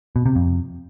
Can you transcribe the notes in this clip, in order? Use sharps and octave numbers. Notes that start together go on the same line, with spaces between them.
B2
C3
F2